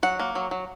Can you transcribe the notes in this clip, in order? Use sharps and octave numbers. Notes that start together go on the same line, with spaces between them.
F#3 F#5
A#3
F#3
F#3